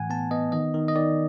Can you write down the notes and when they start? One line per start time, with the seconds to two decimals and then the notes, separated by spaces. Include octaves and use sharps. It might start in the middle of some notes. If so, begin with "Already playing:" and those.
Already playing: A2 E3 F#5 G#5
0.10 B3 A5
0.31 B3 D#5
0.52 D#3 D#5
0.74 D#3
0.88 D#5
0.95 D#3 D5